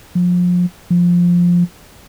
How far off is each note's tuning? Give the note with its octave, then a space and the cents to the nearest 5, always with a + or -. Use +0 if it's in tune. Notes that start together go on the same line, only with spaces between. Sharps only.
F3 +30
F3 +5